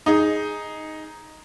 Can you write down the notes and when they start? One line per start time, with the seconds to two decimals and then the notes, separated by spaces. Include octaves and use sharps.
0.06 D#4 G#4